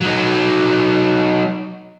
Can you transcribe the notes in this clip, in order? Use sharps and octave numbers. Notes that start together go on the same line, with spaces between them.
F#3 D#4